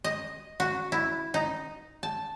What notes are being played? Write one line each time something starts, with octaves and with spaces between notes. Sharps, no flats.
D#5
F#4
E4
D#4
A5